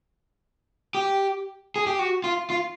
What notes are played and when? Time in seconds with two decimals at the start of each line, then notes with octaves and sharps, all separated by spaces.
0.95 G4
1.76 G#4
1.87 G4
1.99 F#4
2.24 F4
2.50 F4